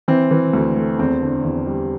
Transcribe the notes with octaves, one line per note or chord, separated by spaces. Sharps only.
E3 C4
E3
D2
A3
E2 C4
D3
E2
G3